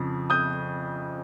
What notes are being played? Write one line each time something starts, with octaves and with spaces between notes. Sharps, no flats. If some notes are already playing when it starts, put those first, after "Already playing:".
Already playing: F2 C#3 F3
D#6 G6